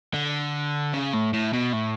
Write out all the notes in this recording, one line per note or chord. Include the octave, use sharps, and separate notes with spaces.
D3
C#3
A2
A2
B2
A2